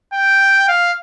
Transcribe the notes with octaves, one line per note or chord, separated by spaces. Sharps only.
G5
F5